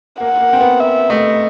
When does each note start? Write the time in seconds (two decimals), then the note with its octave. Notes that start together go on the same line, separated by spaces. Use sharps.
0.20 A#3 F#5
0.41 A#3
0.53 C4
0.61 B3
0.80 E5
1.10 A3 D#5